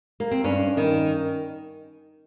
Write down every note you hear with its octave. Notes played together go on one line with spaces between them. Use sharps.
A#3
C4
G2 C#4
D#3